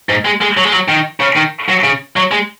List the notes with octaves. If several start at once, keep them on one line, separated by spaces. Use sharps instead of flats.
G#2
G#3
G#3
F#3
G#3
F#3
D#3
C#3
D#3
F#3
C#3
F#3
G#3